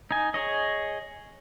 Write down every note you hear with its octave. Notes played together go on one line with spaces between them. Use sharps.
D#4 G#5
G#4 C#5 D#5